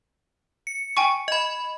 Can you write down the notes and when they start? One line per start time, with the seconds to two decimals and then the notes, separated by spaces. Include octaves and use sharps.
0.67 C#7
0.97 G5 G#5 C#6
1.28 D#5 B5